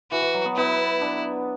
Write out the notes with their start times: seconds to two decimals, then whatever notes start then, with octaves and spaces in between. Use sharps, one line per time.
0.12 E3 F#4
0.22 E3
0.34 F#3
0.45 B3
0.56 B3 E4
1.01 D4